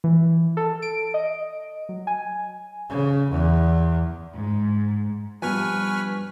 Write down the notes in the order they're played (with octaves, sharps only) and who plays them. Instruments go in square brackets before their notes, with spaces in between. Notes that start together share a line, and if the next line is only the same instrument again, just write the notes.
[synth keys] E3
A4
D7
D#5
F#3
G#5
[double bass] C#3
E2
[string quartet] G#2
[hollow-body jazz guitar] G2 B2 F3 [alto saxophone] B4 [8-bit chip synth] G#5 C#6 F6